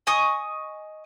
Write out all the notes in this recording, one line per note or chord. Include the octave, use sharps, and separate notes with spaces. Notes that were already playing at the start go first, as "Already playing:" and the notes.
D#5 G#5 C#6 D#6